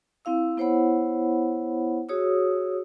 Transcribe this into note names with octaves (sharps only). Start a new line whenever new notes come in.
C4 E4 F5 E6
B3 E4 C5 C#5 F#5 B5
F#4 G#4 C#5 D#6 E6